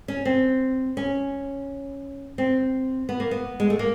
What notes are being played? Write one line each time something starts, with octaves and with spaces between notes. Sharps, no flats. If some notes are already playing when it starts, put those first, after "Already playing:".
C#4
C4
C#4
C4
B3
A#3
B3
G#3
A3
A#3